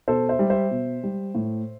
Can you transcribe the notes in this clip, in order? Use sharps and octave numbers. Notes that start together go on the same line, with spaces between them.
B2 A4 C5
C5 E5
G3
C5 E5
B2
G3
A2